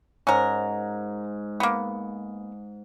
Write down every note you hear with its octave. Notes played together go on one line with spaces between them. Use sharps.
G#2 C#4 A#4
A#3 B3